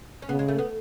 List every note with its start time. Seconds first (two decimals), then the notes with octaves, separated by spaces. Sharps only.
0.22 C#4
0.29 C#3 B3
0.39 G#3
0.48 A3
0.58 B3